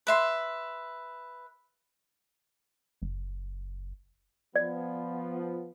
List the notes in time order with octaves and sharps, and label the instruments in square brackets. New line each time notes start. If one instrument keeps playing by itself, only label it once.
[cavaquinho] B4 E5 C6
[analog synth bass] F#1
[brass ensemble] F3 B3 [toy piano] D5